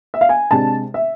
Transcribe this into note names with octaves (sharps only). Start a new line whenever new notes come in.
E5
F5
G#5
C3 G#3 D4 A5
E5